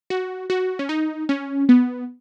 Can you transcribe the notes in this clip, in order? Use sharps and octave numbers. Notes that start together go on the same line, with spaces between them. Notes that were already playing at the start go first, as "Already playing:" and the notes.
F#4
F#4
C#4
D#4
C#4
B3